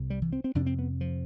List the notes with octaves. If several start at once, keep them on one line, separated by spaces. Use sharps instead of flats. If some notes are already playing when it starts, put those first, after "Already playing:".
Already playing: C2 C3
G3
E3
C4
C4
F2 C3 D4
C4
B3
F3